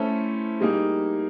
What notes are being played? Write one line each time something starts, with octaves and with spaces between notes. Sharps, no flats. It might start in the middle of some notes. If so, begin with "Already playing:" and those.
Already playing: A3 C#4 E4 A4 C5
G3 A#3 D#4 G#4